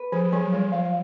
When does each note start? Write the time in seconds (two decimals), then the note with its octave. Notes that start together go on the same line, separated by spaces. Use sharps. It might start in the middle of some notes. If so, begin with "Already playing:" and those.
Already playing: B4
0.12 F3 G#4
0.32 F#3 G#4
0.52 G3 F4
0.72 F3 F5